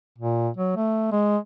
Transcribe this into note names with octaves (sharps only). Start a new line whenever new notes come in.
A#2
F#3
A3
G#3